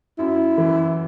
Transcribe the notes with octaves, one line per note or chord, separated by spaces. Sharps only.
F#2 E4
E3